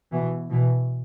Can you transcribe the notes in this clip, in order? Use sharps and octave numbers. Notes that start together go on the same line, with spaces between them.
B2 E3
B2 E3